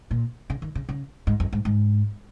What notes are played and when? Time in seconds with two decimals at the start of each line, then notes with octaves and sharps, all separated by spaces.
0.11 A#2
0.50 C#3
0.62 D#3
0.75 C#3
0.89 C#3
1.27 G#2
1.40 F2
1.53 G#2
1.65 G#2